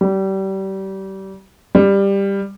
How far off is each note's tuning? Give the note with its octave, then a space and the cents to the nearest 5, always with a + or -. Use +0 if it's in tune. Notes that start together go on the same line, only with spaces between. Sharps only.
G3 -30
G3 +10